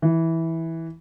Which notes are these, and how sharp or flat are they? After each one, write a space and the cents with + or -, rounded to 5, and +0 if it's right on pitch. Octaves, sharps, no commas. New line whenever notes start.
E3 -10